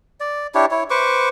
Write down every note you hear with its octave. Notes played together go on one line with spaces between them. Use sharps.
D5
D4 E4 G4 C#5
E4 C#5
B4 C5 C#6 D6